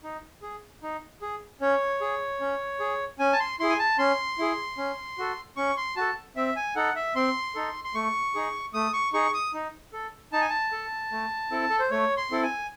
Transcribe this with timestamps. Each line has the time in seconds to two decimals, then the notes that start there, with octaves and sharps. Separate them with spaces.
0.03 D#4
0.42 G#4
0.83 D#4
1.22 G#4
1.61 C#4 C#5
2.01 G#4
2.40 C#4
2.80 G#4
3.19 C#4 G#5
3.33 A5
3.40 C6
3.60 E4 G#4 C6
3.69 G#5
3.79 A5
3.98 C#4 C6
4.38 E4 G#4
4.78 C#4
5.18 F#4 A4
5.57 C#4 C#6
5.77 C6
5.96 F#4 A4 A5
6.36 C4 E5
6.56 G#5
6.76 D#4 A4 F#5
6.96 E5
7.15 C4 C6
7.55 D#4 A4
7.84 C6
7.94 A3 C#6
8.35 D#4 G#4
8.74 A3 D#6
8.93 C#6
9.13 D#4 G#4 C#6
9.34 D#6
9.54 D#4
9.93 A4
10.32 D#4 A5
10.41 G#5
10.49 A5
10.72 A4
11.12 A3
11.51 C4 E4 A4
11.70 A4
11.79 C5
11.90 A3 C#5
12.17 C6
12.31 C4 E4 A4
12.43 G#5